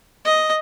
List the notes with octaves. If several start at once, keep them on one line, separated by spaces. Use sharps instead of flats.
D#5